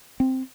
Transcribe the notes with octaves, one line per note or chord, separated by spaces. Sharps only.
C4